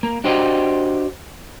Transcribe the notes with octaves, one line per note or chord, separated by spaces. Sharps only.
A#3
D4 F#4 G4 C5 D#5